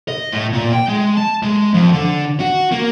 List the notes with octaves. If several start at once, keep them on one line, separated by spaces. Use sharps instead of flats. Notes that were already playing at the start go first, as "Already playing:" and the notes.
D#5
A2
A#2
G5
G#3
A5
G#3
F2
D3
F#4
A#3